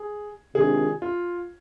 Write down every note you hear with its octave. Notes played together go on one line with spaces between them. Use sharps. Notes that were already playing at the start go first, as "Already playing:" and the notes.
Already playing: G#4
C3 D#3 G#3 D4 F4 G#4
F4